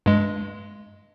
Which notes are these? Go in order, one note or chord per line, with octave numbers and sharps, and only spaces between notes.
G2 G#3